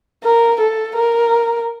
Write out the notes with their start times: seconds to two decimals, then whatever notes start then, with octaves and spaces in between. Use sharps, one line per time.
0.24 A#4
0.60 A4
0.96 A#4